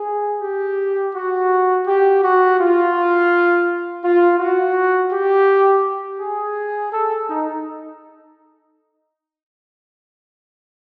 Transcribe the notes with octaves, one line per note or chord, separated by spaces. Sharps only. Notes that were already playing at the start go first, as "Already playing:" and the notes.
Already playing: G#4
G4
F#4
G4
F#4
F4
F4
F#4
G4
G#4
A4
D#4